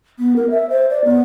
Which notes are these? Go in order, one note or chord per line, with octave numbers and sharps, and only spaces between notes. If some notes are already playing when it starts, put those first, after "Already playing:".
B3
A#4
E5
C5
D5
B3